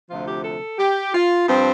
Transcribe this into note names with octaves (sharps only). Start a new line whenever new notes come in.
D2 C3 F3 F4
G4
A4
G4
F4
G2 F3 C4